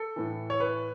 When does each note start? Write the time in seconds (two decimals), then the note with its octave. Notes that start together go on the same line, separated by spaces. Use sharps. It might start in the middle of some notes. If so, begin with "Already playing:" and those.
Already playing: A4
0.16 A2 E3
0.50 C#5
0.60 B4